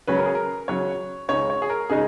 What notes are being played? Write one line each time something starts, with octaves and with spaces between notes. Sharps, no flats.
C#3 F#3 C#4 B4
A#4
G#4
A#4
C#3 F#3 C#4 C#5
C#2 C#3 G#3 D#4 C#5
C#5
G#4
A#4
C#3 G#3 D#4 G#4